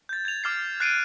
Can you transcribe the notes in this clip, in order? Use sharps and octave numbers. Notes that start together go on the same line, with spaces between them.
G6 A6
G#6 A6 F7
D6 F6 A6 C7 F7
F#6 A6 C7 D7 D#7